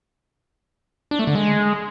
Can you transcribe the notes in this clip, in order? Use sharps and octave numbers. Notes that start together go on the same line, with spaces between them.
D4
A3
D3
G#3